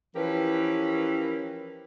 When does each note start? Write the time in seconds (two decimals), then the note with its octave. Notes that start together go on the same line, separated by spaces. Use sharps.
0.16 E3 F3 C#4 G4 A#4 B4